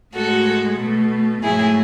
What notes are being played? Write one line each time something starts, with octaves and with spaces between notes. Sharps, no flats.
A2 G#3 F#4 A4
B2 A3
G#2 F#3 A3 E4 G#4